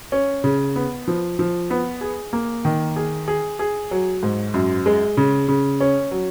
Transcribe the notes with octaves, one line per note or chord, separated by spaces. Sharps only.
C#4
C#3
B3
F3
F3
B3
G#4
A#3
D#3
G#4
G#4
G#4
F#3
G#2
F#2
G#3
C#3
C#3
C#4
F#3